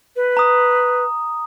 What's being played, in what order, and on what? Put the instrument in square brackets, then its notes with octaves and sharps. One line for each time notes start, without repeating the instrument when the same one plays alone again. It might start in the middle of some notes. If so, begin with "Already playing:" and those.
[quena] B4
[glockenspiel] A#5 D#6